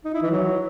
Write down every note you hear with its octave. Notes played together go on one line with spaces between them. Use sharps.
D#4
E4
E3
F#3